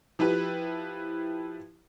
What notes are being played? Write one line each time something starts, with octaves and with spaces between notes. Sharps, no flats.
F3 E4 G4 B4